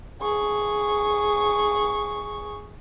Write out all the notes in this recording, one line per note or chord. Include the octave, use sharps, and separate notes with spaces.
G#4 C#6